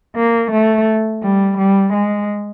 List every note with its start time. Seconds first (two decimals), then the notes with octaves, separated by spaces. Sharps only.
0.16 A#3
0.51 A3
1.22 G3
1.58 G3
1.93 G#3